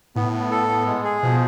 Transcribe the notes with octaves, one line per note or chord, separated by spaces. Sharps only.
A2 B3
B3
A4
B3
G#3
G#4
B2 F3